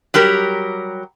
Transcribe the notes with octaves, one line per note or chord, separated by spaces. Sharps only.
F#3 G3 G4 A#4